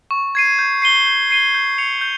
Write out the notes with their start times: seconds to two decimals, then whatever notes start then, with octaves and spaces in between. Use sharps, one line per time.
0.11 C#6
0.35 G#6 C7 D#7
0.59 G6
0.82 C7 D#7 G7
1.06 G6
1.30 C7 D#7 G7
1.54 G6
1.78 C#7 F7
2.01 G6